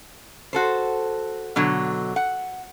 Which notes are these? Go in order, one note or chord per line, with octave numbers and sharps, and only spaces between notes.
F#4 A4 C5
B2 D3 F#3
F#5